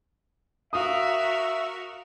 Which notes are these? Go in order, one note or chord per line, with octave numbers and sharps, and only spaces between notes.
F#4 A#4 E5 F5 C#6 D#6